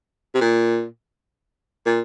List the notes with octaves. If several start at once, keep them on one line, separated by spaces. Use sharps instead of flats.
C3
A#2
A#2